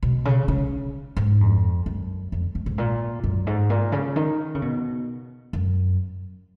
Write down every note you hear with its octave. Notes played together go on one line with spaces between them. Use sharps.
B2
C#3
C#3
G#2
F2
F#2
F2
F#2
G#2
A#2
F#2
G#2
A#2
C#3
D#3
C#3
B2
F#2